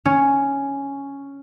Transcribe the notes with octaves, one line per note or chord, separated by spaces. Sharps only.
C#4